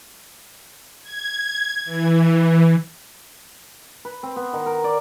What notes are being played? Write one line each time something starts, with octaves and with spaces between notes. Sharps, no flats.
G#6
E3
B4
C4
B3
D#3
A#4
D5